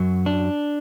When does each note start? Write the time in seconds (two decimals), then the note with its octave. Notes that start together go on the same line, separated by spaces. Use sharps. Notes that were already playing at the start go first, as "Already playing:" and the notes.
Already playing: F#2 F#3
0.26 D4